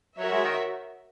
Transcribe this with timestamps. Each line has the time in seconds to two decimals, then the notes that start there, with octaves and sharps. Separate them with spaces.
0.18 F#3 F#4 A#4 C#5 E5
0.31 G#3
0.44 D#3